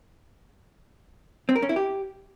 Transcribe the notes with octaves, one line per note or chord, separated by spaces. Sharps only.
C4
A#4
C#4
E4
G4